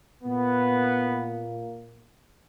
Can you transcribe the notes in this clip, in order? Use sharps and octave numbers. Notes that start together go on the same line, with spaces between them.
A#2 A#3 B3